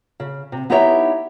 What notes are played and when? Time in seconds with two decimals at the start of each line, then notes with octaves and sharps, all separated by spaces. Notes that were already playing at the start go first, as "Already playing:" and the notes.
0.20 C#3
0.52 C3
0.70 B3 D#4 E4 G4 C#5 E5